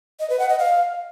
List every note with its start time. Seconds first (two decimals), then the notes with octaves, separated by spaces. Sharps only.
0.20 D#5
0.30 B4
0.39 F#5
0.49 D#5
0.59 F5